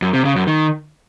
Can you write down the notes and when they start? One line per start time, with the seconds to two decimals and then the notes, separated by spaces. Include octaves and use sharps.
0.02 F#2
0.13 C3
0.25 C#3
0.36 F#2
0.47 D#3